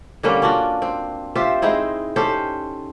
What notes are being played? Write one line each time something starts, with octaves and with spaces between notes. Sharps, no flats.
D3 G3 A#3 C#4
C#4 D4 F4 F#4
C4
F4 G4 C5 E5
G#3 C4 D#4 E4
C#4 G4 A4 C5